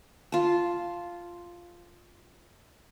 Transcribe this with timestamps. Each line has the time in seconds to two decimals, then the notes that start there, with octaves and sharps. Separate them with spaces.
0.32 F4 A5